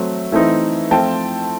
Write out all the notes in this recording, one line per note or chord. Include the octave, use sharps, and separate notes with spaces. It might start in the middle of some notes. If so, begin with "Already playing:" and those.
Already playing: F#3 A3 C4
E3 A3 C4 D#4
F3 A3 C4 F4 G5 A5